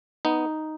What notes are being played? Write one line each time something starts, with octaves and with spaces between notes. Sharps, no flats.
B3 D#4